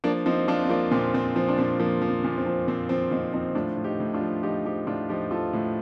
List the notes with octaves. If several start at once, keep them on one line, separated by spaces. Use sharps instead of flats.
F3 A#3 D4
F3 C4 D#4
F3 D4 F4
C4
F3 A#3 D4
A#2 C4
A#2 C4
F3 C4
D4
A#2 C4
F3 A#3
F3
C4
A#2
C4
F3
A#2 C4
F3 C4
A#2 C4 D#4
F3 C4 D#4
A2 D4 F4
A2
D#4 G4
A2
D4 F4
F3
F3 D#4 G4
F3 D#4 G4
A2 D4 F4
F3 D#4 G4
F3 F4 A4
A2